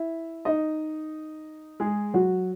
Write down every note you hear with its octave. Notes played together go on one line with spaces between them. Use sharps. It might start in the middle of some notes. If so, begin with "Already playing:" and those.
Already playing: E4 E5
D#4 D#5
G#3 G#4
F#3 F#4